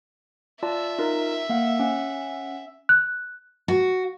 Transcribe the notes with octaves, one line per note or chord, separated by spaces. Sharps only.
F4 D5 E5 A5
D#4 F4 A#4
A#3 F5 F#5
C#4 F#5
F#6
F#4